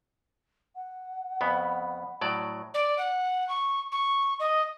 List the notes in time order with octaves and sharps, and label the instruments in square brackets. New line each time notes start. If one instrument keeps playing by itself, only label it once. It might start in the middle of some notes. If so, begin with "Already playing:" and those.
[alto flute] F#5
[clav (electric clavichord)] F2 C#3 B3 [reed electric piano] B5
[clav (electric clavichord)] A2 F#3 D5
[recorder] D5
F#5
C#6
C#6
D#5